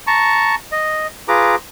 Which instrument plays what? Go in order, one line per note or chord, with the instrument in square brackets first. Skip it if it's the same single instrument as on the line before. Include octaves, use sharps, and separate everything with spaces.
[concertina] A5 A#5 C#6
D#5
F4 G#4 B4 A#5 D6